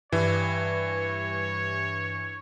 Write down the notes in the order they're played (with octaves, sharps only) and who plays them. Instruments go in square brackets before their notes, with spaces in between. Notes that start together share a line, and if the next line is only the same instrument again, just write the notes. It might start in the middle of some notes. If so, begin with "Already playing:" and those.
[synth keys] G2 [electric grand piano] E3 [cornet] C#5